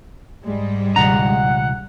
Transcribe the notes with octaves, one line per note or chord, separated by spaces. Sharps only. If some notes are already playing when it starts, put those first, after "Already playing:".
G#2 G3 G#3
C#2 B2 D#3 D4 F#5 A#5